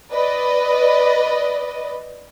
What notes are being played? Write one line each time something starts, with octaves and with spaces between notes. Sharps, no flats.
B4 D5 D#5